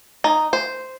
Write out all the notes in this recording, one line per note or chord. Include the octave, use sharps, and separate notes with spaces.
D#4
C5